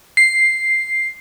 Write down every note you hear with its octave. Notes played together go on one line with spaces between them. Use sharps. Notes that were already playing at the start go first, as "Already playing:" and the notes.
C7